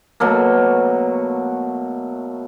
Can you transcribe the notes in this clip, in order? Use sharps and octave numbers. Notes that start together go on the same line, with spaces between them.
B2 F#3 A3 A#3